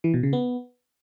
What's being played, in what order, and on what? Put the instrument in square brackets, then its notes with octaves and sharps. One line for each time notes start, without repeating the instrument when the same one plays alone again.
[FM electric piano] E3
B2
C#3
B3